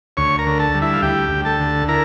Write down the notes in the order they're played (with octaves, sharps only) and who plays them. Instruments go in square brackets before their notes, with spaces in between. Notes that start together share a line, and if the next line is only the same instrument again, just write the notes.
[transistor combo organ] D2 C#5 C#6
A#4 A#5
D3
A4 A5
G3
E4 E5
F5
D2 G4 G5
D2
A4 A5
D3
E4 A#4 A#5